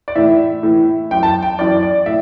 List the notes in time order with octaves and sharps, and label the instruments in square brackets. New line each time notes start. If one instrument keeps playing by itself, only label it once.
[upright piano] D5
A2 E3 E5
A2 E3
F#2 E3 G5
A5
G5
G5
F#2 E3 D5
D5
A2 E5